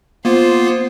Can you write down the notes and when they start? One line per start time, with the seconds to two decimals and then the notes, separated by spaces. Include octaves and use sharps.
0.25 A#3 B3 F4 C5